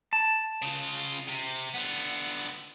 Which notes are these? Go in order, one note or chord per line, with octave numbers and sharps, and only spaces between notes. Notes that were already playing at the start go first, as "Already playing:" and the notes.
A5
C#3 F4
C3
D3 B3